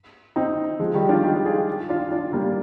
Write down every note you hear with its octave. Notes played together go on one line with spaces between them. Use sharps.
C4 D#4
F3 G#3
D#3 G3
D4 F4
D#4 G4
F4 G#4
D4 F4
D4 F4
G3 A#3